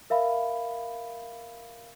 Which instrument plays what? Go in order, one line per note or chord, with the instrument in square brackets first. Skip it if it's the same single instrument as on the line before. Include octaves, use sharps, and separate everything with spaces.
[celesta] A#4 E5 F5 B5